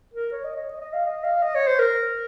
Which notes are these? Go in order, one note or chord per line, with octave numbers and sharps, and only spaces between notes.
A#4
C#5
D#5
C#5
D#5
D#5
F5
D#5
F5
D#5
C#5
C5
A#4